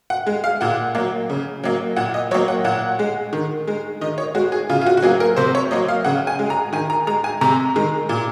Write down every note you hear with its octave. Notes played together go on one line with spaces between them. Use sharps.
F#5
G#3
F5
A#2 F#5
F#3 A#3
C#3
F#3 A#3
A#2 F#5
D#5
F#3 A#3 C#5
F#5
A#2 F#5
G#3
D#3
G#3
D#3 D#5
C#5
G#3 F#4
G#4
C#3 F4
F4
F#4
F#4
F#3 A#3 G#4
A#4
C3 C5
C#5
F#3 A#3 D#5
F5
C#3 F#5
G#5
G#3
A#5
D#3 G#5
A#5
G#3 A#5
G#5
C3 A#5
D#3 G#3
A#2